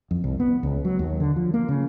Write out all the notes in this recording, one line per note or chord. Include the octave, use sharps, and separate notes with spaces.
F2
C2
B3
C#2
F#3
D#2
D3
F3
A#3
C#3